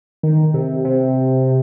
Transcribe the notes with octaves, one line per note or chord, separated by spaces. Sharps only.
D#3
C3
C3